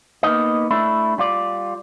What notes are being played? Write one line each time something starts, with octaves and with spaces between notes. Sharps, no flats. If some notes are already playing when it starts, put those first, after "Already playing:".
A#3 B3 D#4 D#5
A3 D4 E4
G3 F4 D5